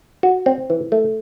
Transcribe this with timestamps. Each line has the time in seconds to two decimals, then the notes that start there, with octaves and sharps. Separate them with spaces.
0.23 F#4
0.46 C4
0.70 E3
0.92 A3